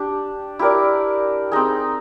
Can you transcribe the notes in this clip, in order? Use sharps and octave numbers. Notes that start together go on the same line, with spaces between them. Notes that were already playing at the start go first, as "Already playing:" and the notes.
Already playing: D4 G4
E4 G4 A#4 D5
C4 D#4 G#4